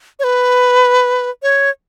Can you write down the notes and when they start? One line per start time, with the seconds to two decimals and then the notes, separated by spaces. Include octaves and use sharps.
0.19 C#5
0.24 B4
1.42 C#5